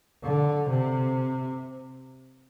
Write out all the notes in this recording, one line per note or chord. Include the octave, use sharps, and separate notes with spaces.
D3
C3